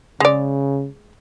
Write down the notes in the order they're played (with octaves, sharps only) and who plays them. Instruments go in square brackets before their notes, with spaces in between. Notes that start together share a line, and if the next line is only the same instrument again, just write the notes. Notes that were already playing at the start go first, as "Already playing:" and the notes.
[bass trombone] C#3 [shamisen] G#3 D5